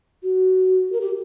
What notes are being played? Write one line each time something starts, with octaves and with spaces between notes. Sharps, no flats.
F#4
A#4
G4